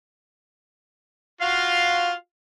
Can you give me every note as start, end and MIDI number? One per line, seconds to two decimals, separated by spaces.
1.41 2.12 65
1.41 2.12 66
1.41 2.12 77